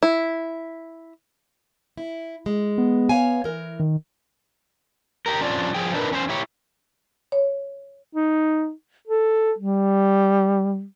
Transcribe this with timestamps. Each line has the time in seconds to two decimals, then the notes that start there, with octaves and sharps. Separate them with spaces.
0.03 E4
1.97 E4
2.46 G#3
2.78 B3
3.09 C#5 F5 G#5
3.44 E3 A#4
3.80 D#3
5.26 G4 A#4
5.41 F2 C#4 D4 F4 D5
5.75 F3 G#4 G5
5.92 D#3 G3 D4 E4 A#4 B4
6.11 E2 C#4 D#4 C5
6.29 E4 G4 C#5
7.32 C#5
8.13 D#4
9.08 A4
9.59 G3